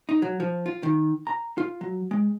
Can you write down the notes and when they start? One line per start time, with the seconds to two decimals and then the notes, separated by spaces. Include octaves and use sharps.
0.09 D#4
0.22 F#3
0.40 F3
0.66 F4
0.83 D#3
1.27 A#5
1.58 F4
1.81 F#3
2.11 G#3